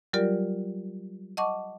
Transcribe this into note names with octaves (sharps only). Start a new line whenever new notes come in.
F#3 G3 F4 G4 A#4 D5
D#5 F#5 A5 C#6 D6